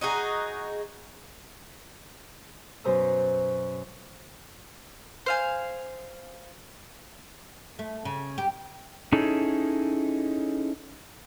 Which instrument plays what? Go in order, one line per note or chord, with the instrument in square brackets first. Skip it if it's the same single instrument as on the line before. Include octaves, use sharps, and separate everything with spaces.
[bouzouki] D#4 F#4 G#4
[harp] F#2 B2 C5 A#5 D#6 E6
[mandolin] C5 F5 G#5
[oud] A3
C#3
G4
[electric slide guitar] C#4 D#4 E4 G#4 A4